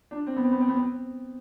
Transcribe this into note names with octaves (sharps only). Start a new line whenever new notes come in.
D4
C4
B3
C4
B3
C4
B3
C4